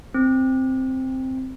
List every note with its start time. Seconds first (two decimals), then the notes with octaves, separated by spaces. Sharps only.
0.14 C4